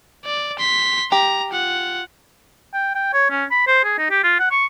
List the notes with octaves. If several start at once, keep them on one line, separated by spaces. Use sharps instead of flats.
D5
C6 B6
G4 A#5
F4 F#5
G5
G5
C#5
C#4
B5
C5
G#4
D#4
G4
F4
F#5
C#6